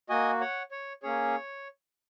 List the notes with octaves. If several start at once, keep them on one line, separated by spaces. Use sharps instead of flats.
A#3 F#4 D#5 G#5
C#5 F#5
C#5
A#3 C#4 G#4 C#5